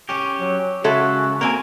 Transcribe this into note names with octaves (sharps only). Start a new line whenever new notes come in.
C#4 G4
F#3
C#3 G#3 F#4 A4 E5
A#3 C4 A#4 G#5